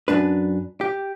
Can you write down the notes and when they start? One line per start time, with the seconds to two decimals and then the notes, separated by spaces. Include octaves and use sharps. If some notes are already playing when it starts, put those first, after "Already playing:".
0.08 F#2 D4 B4
0.81 G4